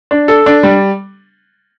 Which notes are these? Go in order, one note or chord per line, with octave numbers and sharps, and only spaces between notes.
D4
A4
D4
G3